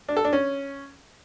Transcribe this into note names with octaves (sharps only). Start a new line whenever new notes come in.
D4
A4
D4
C#4